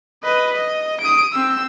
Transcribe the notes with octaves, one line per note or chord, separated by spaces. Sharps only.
B4 D#5
D#5
D#6 D7
C4 E6